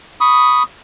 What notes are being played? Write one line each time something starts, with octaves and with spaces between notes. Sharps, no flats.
B5 C#6 D#6